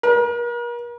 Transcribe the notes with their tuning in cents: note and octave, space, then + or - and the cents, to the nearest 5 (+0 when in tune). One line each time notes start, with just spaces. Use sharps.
A#4 +40